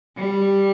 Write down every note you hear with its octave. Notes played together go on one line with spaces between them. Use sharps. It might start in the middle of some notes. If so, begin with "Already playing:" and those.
G3